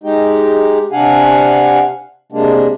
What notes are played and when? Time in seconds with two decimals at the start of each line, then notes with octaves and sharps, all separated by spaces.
0.03 G#3 D#4 G4
0.92 C3 D4 F5 F#5 G#5
2.32 C3 G#3 A#3 D4